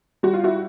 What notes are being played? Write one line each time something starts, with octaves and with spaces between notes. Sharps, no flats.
G3 F#4
F4
E4 F#4